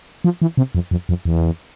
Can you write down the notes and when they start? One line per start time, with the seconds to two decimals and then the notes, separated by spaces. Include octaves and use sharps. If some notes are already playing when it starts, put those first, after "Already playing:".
0.24 F3
0.42 E3
0.57 C3
0.75 F2
0.91 F2
1.09 F2
1.25 E2